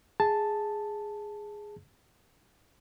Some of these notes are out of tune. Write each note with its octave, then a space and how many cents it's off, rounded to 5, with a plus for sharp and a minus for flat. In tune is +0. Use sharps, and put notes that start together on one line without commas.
G#4 +0 A5 +0